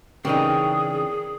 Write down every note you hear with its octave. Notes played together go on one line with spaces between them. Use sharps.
C#3 E3 C4 D#4 G4 G#4 A#4 D5